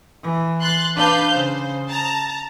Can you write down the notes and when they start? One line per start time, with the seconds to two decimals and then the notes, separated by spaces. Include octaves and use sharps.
0.23 E3
0.60 C6 F#6 A6
0.96 D4 B4 F5 G6
1.32 C#3 C5
1.90 A5 A#5